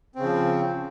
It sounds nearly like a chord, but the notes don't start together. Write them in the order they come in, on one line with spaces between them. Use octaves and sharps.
C4 C#3 F3